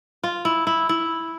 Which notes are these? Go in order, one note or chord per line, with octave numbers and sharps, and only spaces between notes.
F4
E4
E4
E4